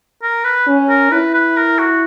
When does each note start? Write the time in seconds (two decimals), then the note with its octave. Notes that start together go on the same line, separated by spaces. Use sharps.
0.22 A#4
0.45 B4
0.67 C#4
0.89 A#4
1.12 E4 B4
1.34 B4
1.57 A#4
1.79 F#4